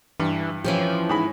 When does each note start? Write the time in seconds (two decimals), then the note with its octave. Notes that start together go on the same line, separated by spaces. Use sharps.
0.20 G2 E3
0.64 E3 F3 C#4 G4
1.09 G#2 G#4 B5